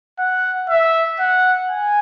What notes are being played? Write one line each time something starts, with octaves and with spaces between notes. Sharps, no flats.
F#5
E5
F#5
G#5